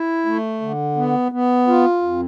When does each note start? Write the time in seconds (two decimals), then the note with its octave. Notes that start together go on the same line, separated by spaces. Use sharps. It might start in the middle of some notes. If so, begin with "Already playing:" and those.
Already playing: E4
0.26 A3
0.61 D3
0.96 B3
1.32 B3
1.68 F4
2.02 F2